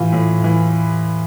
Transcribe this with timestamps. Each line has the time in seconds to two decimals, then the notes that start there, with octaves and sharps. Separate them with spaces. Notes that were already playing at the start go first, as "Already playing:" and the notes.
Already playing: A2 E3 F4
0.13 A2
0.44 E3